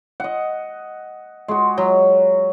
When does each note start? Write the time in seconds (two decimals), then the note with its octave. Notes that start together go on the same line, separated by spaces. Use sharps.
0.20 D#5 F#5
1.48 G#3 F#4
1.78 F#3